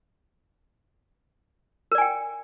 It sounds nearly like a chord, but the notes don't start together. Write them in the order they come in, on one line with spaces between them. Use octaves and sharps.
A#4 D5 G#5 G5